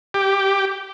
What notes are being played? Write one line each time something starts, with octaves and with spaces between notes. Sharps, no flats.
G4